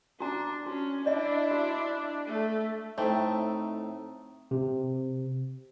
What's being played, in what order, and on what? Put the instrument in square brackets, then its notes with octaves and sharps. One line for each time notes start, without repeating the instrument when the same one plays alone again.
[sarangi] D4 [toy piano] F#4 A#5
[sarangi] C#4 [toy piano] F#4
[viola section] D4 [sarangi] E4 [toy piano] D5 D#5
[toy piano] F#4
[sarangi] A3
[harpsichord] A2 [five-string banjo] A3 [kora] C4 [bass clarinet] D#4
[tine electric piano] C3